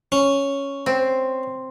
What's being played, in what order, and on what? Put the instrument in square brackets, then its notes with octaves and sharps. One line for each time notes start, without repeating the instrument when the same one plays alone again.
[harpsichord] C#4
[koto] C4